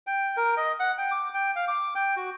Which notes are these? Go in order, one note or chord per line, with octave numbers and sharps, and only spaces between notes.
G5
A#4
D#5
F#5
G5
D6
G5
F5
D6
G5
F#4